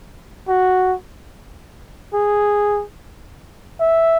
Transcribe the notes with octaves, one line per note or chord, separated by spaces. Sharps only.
F#4
G#4
E5